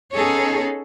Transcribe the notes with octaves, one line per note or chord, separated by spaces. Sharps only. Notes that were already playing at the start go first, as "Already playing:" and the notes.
B3 C#4 D#4 G#4 A4 C#5